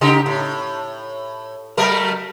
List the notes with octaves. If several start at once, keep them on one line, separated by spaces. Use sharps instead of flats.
C#3 D#4 G4
A2
F#3 A3 A#4